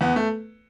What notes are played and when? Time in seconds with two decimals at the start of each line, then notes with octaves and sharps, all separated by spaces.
0.01 E2 B3
0.16 A3